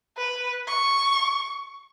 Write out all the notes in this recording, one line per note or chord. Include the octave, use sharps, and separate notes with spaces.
B4
C#6